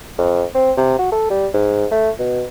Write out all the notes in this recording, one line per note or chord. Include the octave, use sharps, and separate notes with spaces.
F2
C4
C3
F#4
A4
G3
G#2
A3
B2